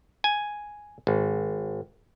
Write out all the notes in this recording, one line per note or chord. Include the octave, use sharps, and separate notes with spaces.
G#5
G#1